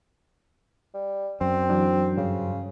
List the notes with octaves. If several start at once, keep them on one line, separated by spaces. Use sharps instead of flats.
G3
F#2 C4
E3 F#3 D4
G2 C#3